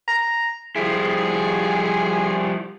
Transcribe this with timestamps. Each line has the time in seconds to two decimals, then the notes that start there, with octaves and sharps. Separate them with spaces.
0.08 A#5
0.76 F3 G3 E4 G#4